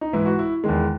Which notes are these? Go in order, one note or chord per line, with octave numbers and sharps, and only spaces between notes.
D#4
G#2 E3 E4
F#4
E4
E2 D#3 G#3